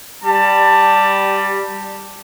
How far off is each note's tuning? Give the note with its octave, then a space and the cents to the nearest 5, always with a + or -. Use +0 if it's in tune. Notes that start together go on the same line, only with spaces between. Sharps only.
G3 +0 A5 +20